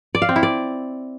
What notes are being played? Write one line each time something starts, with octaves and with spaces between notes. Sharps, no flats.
D5
F5
C4
E4
D5